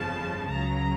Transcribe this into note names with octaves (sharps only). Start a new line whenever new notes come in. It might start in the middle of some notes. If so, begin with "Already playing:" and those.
Already playing: G1 F2 C#3 F3 A5
C#2 C#3 F#3 A#5